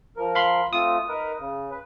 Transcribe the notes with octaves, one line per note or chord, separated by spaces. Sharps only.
F3 A#4
F5 B5 C6
A3 C4 F4 D#6
D#4 A#4 B4
C#3
B4